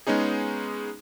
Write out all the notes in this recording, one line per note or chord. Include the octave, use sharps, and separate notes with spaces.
G#3 B3 C#4 D#4 G#4